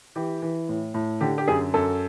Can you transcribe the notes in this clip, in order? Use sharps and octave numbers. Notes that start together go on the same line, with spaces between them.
E3 G4
E3
A2
A2
D3 G4
G4
F#2 G#4
F#2 A4